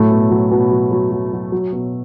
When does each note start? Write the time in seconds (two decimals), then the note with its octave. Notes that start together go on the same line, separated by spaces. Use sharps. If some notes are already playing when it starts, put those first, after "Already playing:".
Already playing: A2 F#3 A3
0.11 B2
0.31 F#3
0.51 B2
0.71 F#3
0.91 F#3
1.12 F#3
1.33 F#3
1.52 F#3
1.73 B2